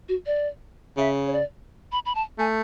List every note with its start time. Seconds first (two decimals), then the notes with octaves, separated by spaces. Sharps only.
0.09 F#4
0.26 D5
0.97 C#3 E5
1.26 C#5
1.33 D5
1.92 B5
2.06 B5
2.15 A5
2.39 A3 G#5